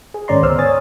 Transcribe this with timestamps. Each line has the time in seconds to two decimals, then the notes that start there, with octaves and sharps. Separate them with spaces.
0.14 G#4
0.28 G#2 D#3 C#4 D5 A#5 C6
0.43 D2 B3 C5 C6 E6 F6
0.58 C#5 G#5 D#6 A6